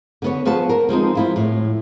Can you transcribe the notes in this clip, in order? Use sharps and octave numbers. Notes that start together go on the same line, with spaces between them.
D3 B3 C#5
F3 B3 G#4 B4 A5
A#4
F3 G#3 C4 D#4
F3 E4 F4
A2